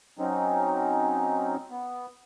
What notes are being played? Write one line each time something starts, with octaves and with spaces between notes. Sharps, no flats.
F#3 C4 C#4 D#4
B3